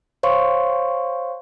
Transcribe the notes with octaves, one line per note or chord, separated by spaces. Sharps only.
C5 C#5 F5 C6 C#6